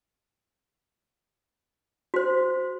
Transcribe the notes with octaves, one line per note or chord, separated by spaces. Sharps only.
F#4 C5